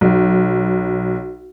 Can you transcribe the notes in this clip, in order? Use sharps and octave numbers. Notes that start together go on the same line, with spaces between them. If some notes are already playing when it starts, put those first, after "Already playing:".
B1